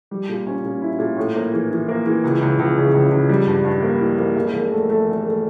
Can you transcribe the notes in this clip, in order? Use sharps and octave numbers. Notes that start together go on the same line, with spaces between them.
G3
A#2
C#4
A#2
E4
A#2
A2
A#3
E3
E3
A#3
E3
C#2
C#2
C#2
C#3
C#2
C#2
G3
G2
G2
A#3
E3
A#3
E1
E1
A3
A3
E1
A3